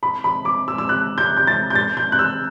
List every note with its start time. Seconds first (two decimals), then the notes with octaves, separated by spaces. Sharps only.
0.03 B5
0.24 B5
0.45 D6
0.68 E6
0.78 E6
0.89 F#6
1.18 G6
1.37 G6
1.47 A6
1.70 G6
1.75 A6
1.97 G6
2.12 F#6
2.19 E6